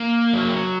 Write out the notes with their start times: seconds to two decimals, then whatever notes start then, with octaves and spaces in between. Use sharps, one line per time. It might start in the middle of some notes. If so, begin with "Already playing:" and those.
Already playing: A#3
0.33 F#3